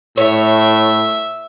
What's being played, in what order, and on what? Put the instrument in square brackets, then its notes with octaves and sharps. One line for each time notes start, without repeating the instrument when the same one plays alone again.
[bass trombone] A2 [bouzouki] C#5 [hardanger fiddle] E5